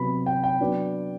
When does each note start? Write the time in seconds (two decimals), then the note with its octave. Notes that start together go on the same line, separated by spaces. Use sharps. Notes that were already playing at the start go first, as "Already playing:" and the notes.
Already playing: C3 F#3 B3 B5
0.26 G5
0.44 G5
0.60 F#3 B3 D4